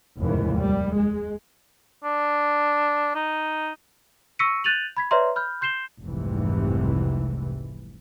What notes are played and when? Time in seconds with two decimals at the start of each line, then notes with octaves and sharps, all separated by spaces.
0.19 F1 D#2 G#2 C#3 E3
0.59 G3
0.95 G#3
2.04 D4
3.15 D#4
4.39 C#6 E6 A#6 B6 C#7 D#7
4.64 F#6 G6 A6 D#7 F7 F#7
4.97 B5 G#6 B6
5.11 B4 C#5 D5 E5 A#5 C6
5.36 B5 F6 G6
5.61 C6 G6 C7 E7 G7
6.04 F1 C2 G#2 C3 E3